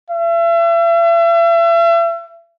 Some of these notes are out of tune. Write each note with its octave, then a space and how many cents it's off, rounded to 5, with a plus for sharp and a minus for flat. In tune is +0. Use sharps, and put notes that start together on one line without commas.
E5 +40